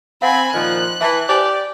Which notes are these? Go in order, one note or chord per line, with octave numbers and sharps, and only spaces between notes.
C4 F5 F#5 G#5 B5
A#2 D#3 F3 F#6
E3 E5 A5
G4 C5 D5 G#5